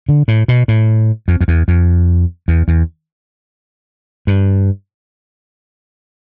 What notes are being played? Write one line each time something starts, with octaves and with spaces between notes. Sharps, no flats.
D3
A2
B2
A2
F2
F2
E2
F2
E2
E2
G2